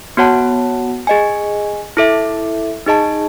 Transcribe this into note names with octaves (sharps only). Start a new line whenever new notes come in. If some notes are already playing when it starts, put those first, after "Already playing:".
B3 F#4 C#5 F#5 A5
G#4 D#5 G#5
E4 A4 E5
D#4 G#4 D#5 A5